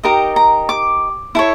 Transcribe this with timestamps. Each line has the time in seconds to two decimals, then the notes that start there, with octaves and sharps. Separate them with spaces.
0.04 D#4 G4 A#4 D#5 A#5
0.36 A#5
0.69 D6
1.35 E4 A4 C#5